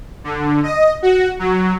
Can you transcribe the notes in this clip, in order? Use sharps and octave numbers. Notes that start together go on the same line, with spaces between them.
D3
D#5
F#4
F#3